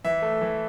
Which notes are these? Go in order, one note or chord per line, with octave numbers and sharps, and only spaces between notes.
E3 E5
A3
E3